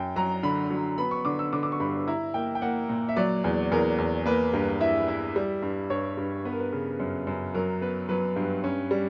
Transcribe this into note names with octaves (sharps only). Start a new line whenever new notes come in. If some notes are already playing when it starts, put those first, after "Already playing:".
Already playing: F#2 G5
F#3 A#5
D3 B5
F#3
B3 B5
C#6
D3 D6
E6
D3 D6
D6
C#6
G2 B5
E4 A#5
A#3 G5
G5
A#3 F#5
A#2
E5
F#3 D5
E2
E2 A#4
E2
A#3 B4
G2
E4 E5
E4
G3
G2
G2 C#5
G2
B3 B4
A#4
B4
C#3
F#2
F#2
F#3 A#4
B3 B4
F#3 B4
G2
C#4
G3